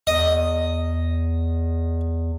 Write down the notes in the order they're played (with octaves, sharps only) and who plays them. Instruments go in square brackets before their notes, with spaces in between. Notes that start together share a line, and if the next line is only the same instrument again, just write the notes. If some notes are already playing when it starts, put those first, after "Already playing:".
[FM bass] E2 [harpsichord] D#5